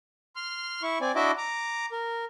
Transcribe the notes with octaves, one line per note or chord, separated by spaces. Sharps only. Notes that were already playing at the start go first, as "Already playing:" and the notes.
C6 F6
E4 C#6
C4 D5 G#5
D4 E4 F#4 D#5 E5 D6
A#5 D6
A#4